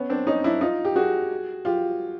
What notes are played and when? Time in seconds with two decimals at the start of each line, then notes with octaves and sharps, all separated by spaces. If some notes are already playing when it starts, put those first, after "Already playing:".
Already playing: B3 C#4
0.10 C4 D4
0.27 C#4 D#4
0.44 D4 E4
0.61 D#4 F4
0.85 G4
0.96 F#4 G#4
1.65 F4 G4